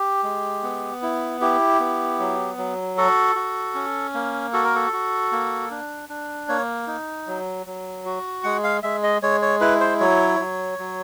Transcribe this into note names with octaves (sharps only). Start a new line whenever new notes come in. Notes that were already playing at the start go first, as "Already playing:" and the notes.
Already playing: G4
G#3
B3
E4
E4 G4
B3
F#3
F#3
F#4 A4
F#4
C#4
A#3
F#4 A4
A#4
A4
F#4
A#3
D4
D4
A#3 C#5
D#4
F#3
F#3
F#4
G#3 F#5
F5
G#3 E5
D#5
G#3 C#5
C#5
E4 B4
C5
F#3 C#5
F#3
F#3